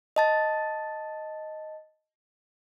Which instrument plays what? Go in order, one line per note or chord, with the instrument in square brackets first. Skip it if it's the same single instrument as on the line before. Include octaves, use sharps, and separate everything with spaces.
[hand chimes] D#5 A5 A6